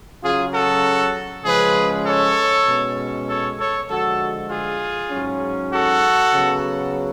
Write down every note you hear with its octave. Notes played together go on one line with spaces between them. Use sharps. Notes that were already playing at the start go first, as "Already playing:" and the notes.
C#3 F#3 C#4 F4 G#4
F#4 A4
C#3 F3 G#3 C#4 G#4 B4
A4 C#5
B2 G#3 C#4
A4 C#5
A4 C#5
D3 F3 G#3 F#4 A4
F4 G#4
G#2 F#3 C#4
F#4 A4
C#3 F#3 B3